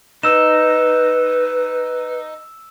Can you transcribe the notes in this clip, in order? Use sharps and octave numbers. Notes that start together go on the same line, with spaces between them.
D#4 B4 E6 E7